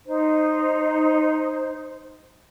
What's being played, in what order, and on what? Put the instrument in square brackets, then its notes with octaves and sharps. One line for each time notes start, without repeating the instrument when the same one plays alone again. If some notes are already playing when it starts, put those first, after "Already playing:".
[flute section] D#4 C5